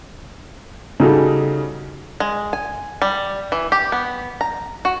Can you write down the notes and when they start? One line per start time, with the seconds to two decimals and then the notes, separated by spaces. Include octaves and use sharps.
1.00 C#3 G3 D#4 F#4 G#4 A4
2.20 G#3
2.53 G#5
3.02 G3
3.52 E3
3.72 G4
3.92 B3
4.41 A#5
4.85 F#4